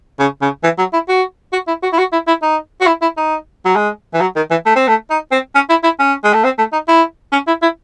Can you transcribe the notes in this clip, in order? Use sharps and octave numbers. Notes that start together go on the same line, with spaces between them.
C#3
C#3
E3
F#3
E4
F#4
F#4
E4
F#4
E4
F#4
E4
E4
D#4
F#4
E4
E4
D#4
F#3
G#3
E3
F#3
D#3
E3
A3
C4
A3
D#4
C4
C#4
E4
E4
C#4
G#3
A3
C4
A3
D#4
E4
C#4
E4
E4